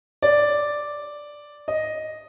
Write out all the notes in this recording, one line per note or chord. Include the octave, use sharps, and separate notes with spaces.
D5
D#5